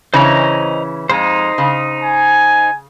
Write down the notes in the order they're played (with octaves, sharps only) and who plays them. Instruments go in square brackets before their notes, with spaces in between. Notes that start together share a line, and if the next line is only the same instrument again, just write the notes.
[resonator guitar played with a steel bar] C#3 E3 C#4 [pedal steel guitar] C5 D#5 A#5
[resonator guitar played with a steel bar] F2 G#3 [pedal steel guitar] D#4 C5
[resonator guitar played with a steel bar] C#3
[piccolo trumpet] G#5